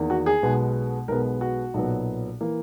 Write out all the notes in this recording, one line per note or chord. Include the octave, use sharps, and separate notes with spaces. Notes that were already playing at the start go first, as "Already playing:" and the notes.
Already playing: E2 D#3 A#3
F#4
G#4
B1 B2 G#3 B3
B1 B2 G#3 B3 A#4
F#4
B1 A#2 F#3 B3
E3 A#3